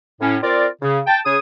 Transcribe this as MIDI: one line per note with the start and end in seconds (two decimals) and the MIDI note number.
0.21 0.37 45
0.21 0.37 61
0.43 0.67 60
0.43 0.67 65
0.43 0.67 70
0.43 0.67 74
0.82 1.00 49
1.07 1.18 79
1.07 1.18 81
1.25 1.38 49
1.25 1.38 68
1.25 1.38 73
1.25 1.38 87